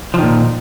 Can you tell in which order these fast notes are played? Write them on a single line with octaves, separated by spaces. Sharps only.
F3 D#3 A#2